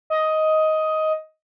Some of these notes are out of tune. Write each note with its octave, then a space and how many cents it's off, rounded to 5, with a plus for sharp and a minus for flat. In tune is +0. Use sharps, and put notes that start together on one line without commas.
D#5 +10